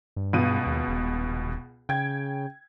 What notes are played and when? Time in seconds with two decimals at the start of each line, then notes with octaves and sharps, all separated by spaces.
0.16 G2
0.33 C#2 B2 D#7
0.66 D#2
0.88 D#1
1.89 C#3 G5 G#6